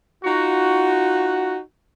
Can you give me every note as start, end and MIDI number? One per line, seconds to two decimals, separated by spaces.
0.24 1.59 63
0.24 1.59 65
0.24 1.59 66